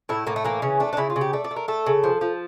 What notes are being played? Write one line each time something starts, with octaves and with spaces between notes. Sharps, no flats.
A2 E4
A2 A#3
A3
E3 A#3
C#3 C#4
A3 D4
D4
C#3 E4
F4
C#3
G4
A3 D5
D5
A3
A#4
A3 A4
C#3
F3
F3